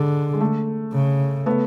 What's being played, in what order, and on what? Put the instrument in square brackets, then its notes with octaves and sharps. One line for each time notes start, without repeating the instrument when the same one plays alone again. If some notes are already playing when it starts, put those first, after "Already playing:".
Already playing: [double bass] D3 [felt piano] G#3
[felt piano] G#3
A3
[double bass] C#3
[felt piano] A3 B3